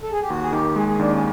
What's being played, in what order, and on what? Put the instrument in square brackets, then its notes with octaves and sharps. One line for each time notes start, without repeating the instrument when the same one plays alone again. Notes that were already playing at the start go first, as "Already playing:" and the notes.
[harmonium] A4
G#4
G4
[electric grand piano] D#2 [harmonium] F#4
[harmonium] G#4
[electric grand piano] D#3 [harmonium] G4
[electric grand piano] G#3 [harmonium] G#4
[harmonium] G#4
[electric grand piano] D#2 [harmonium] D4
[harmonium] C#4